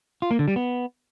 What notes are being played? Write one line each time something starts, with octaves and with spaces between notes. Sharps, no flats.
F4
A#3
D3
G3
B3